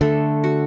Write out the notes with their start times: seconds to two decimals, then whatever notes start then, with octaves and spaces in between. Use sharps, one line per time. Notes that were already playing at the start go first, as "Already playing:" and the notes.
0.01 D3 A3
0.44 F#4